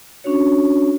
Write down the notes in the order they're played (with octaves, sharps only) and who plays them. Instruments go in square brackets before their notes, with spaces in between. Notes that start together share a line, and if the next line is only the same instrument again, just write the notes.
[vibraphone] C#4 D4 F#4 C#5